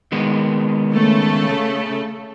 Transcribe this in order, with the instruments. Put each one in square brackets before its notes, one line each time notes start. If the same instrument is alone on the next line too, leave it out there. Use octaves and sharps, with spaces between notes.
[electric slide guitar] D#3 G#3 B3
[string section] C#3 A3 A4